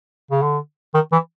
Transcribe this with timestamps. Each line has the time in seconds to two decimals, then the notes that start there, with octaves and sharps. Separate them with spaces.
0.31 C#3
0.42 D3
0.94 D#3
1.12 E3